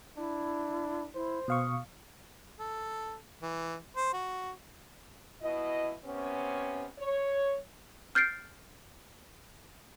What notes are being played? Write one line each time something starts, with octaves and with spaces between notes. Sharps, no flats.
D4 E4
E4 C5
B2 F5 C#6 D#6
A4
E3
C5
F#4
B2 E4 D#5
C3 B3 C#4
C#5
F6 G6 A6 C7 D7